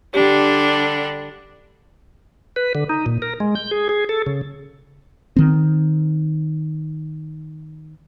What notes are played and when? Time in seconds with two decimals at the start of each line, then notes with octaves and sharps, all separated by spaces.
0.14 D3 G3 D4 G4
2.56 B4
2.75 D3
2.89 D#4
3.06 A#2
3.22 A#4
3.40 G#3
3.55 G6
3.71 G#4
3.89 G#4
4.09 A4
4.27 C#3
5.36 D#3 C4